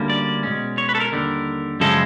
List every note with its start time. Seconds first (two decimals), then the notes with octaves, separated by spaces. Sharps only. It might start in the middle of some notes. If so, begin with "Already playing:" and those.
Already playing: D2 D3 G3 A#3 C#4
0.10 D5
0.43 B2 G#3 C#4
0.78 C#5
0.89 B4
0.95 A4
1.00 A#4
1.12 D#2 D3 G3
1.80 F#2 C#3 F3 G#3 A4